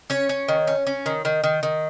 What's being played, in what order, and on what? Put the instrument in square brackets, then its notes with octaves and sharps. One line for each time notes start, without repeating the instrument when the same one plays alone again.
[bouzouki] C#4 C#5
C#4
D#3
C#4
C#4
D#3
D#3
D#3
D#3